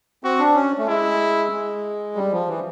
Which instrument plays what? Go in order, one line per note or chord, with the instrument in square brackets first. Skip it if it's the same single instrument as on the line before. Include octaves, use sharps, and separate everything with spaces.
[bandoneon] C4 [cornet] F#4
[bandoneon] D4
C#4
A3
[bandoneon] G#3 [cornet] E4
[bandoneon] G#3
G3
F3
E3